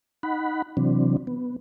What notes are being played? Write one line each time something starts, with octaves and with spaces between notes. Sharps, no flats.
D#4 F#5 B5
C3 E3 F#3 C4 D4
B3